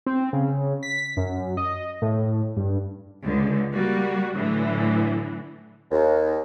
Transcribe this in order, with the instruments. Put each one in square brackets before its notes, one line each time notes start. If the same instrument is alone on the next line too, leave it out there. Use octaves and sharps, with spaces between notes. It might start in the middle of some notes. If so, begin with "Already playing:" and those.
[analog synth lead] C4
C#3
B6
F#2
D#5
A2
G2
[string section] C#2 D3
G3 A#3 F#4
A2 D3 E3 F#3
[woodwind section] D#2